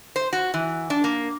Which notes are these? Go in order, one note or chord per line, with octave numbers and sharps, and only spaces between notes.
C5
F#4
E3
D4
A#3